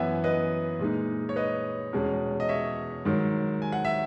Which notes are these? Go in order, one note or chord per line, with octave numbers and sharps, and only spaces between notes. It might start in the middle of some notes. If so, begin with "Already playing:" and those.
Already playing: F#2 E3 B3 E5 F#5 G#5
B4 D#5
A#2 G#3 D#4
C#5
B4 D#5
E2 B2 G#3 C#4
D#5
C#5 E5
G#2 D#3 F#3
G#5
F#5
E5